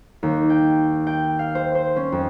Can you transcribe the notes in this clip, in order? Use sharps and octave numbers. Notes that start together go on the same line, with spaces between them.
D#2
G5
G5
F5
C5
C5
C#4
F2